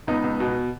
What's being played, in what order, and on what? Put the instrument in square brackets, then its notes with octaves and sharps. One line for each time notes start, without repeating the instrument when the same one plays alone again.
[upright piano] C#2 B3 D#4
C#2
B2